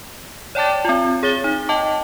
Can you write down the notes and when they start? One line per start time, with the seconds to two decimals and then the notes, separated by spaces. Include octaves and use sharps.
0.55 C#5 D5 G5 A5 D6 A6
0.85 C4 F4
1.23 G#4 C#5 A6 G7
1.44 D#4
1.69 D#5 G5 A5 D6